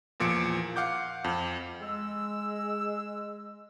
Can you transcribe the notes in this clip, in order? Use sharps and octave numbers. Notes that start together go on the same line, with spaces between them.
E2 A#2 F3 C#7 D7
F5 F#5 D6 G6
F2
G#3 E6